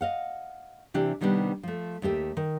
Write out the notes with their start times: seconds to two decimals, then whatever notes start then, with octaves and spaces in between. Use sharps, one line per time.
0.01 D#5 F5 F#5
0.94 C3 E3 D4 G4
1.21 C3 D#3 G3 B3 D4
1.63 F3 A3
2.02 D#2 A3 G4 E5
2.37 D#3